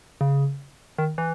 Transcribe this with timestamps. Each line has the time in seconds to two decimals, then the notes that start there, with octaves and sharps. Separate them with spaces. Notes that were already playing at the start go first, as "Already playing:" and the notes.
0.21 C#3
0.98 D#3
1.18 E3